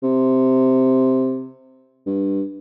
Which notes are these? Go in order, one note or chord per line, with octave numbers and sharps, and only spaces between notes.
C3
G2